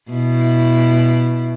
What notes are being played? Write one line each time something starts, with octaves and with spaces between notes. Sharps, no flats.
B2 E4